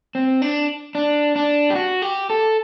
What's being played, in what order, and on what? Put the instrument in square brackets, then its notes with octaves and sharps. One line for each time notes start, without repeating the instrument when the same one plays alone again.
[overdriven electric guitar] C4
D4
D4
D4
G4
F#4
G4
A4